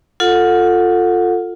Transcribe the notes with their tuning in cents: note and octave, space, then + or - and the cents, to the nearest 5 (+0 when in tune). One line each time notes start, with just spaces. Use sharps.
F4 +10 A4 +15 F#5 -30